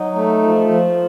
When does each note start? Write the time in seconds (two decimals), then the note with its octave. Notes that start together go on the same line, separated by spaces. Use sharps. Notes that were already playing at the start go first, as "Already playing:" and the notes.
Already playing: F#3 D#4
0.16 A3
0.42 F3
0.68 F3